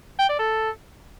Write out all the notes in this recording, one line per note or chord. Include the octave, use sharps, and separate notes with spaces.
G5
D5
A4